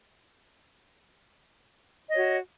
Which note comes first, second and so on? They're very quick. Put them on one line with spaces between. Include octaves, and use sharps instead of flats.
D#5 C#5 F#4